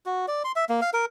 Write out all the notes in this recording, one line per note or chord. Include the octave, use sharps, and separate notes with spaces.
F#4
D5
C6
E5
A#3
F5
A#4